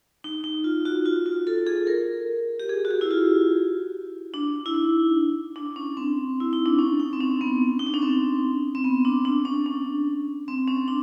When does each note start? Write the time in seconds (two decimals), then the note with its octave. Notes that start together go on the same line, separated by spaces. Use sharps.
0.24 D#4
0.44 D#4
0.64 F4
0.85 F#4
1.06 F4
1.26 F4
1.47 A4
1.67 G#4
1.87 A#4
2.60 G4
2.69 G#4
2.85 F#4
2.91 G4
3.01 E4
3.11 F4
4.34 D4
4.66 E4
4.74 D#4
5.56 D4
5.76 C#4
5.97 C4
6.40 E4
6.53 D#4
6.66 D4
6.79 C#4
6.99 D#4
7.13 C4
7.20 C#4
7.41 B3
7.79 D#4
7.87 D4
7.94 C#4
8.02 C4
8.75 C4
8.84 B3
9.05 D4
9.25 D4
9.45 C#4
9.66 C#4
10.48 C4
10.68 C#4
10.88 D4